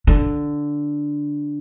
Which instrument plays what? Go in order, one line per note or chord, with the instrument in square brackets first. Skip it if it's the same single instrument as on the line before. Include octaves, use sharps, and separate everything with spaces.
[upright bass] D3